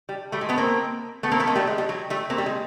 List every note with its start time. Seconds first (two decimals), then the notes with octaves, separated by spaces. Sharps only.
0.09 G3
0.32 G3 A3
0.41 G#3
0.49 A3 B3
0.58 A#3 C4
1.23 A3 B3
1.32 A#3 C4
1.40 A3 B3
1.47 G#3 A#3
1.55 G3 A3
1.67 G#3
1.78 G3
1.89 F#3
2.10 G3 A3
2.30 A#3 C4
2.38 G3
2.46 G#3